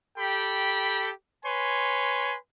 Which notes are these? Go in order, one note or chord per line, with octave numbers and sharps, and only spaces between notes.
G4 A4 G5 B5
B4 C#5 G#5 C6